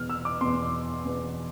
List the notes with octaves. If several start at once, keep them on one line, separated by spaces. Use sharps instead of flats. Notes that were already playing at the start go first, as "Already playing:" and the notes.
Already playing: E2 B2 F6
E6
D6
E2 B2 C6
E2 B2